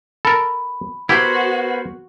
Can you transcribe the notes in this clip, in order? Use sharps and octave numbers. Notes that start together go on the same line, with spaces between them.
A4 A#4 B5
B3 E4 F#4 G4 A#4 C5 G#6